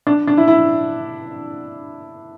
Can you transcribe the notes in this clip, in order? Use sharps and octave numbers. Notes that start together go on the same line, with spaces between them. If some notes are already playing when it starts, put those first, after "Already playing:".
D4
D4
E4
E4